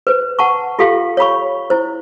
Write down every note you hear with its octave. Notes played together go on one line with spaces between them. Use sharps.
B4 C5
F#5 A5 C#6
F4 G4 A4 F5 C6
C#5 F5 B5 C#6
E4 C5